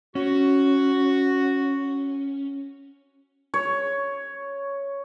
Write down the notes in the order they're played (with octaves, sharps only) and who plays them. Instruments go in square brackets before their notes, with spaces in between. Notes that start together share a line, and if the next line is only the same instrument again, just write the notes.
[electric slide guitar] C#4 [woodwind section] F#4
[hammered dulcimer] C#5